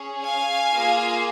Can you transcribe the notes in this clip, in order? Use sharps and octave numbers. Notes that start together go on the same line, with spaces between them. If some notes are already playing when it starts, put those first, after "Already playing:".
Already playing: C#4 G#4 C#5
F5 G#5
A#3 F4 G#4